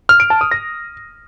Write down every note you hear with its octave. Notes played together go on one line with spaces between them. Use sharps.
F6
D7
A5
D#6
A#6